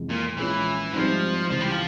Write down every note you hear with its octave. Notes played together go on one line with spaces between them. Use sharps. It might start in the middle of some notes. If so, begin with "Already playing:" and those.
Already playing: F2 C3 E3 G#3
A#2
A#1 A#2 E3 G#3 C#4 F4
G#1 G#2 F3 G3 C4
C#2 C3 E3 F3
G3
F3